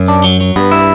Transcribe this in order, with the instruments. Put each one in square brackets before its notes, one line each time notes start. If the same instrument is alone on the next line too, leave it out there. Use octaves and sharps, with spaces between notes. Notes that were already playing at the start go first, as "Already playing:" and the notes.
Already playing: [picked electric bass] F#2
[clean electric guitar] D4
F#3
F#3
[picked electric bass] G2 [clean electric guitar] B3
[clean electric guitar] E4